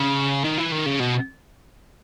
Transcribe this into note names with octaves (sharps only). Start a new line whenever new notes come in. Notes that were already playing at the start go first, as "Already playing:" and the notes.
Already playing: C#3
D#3
E3
D#3
C#3
B2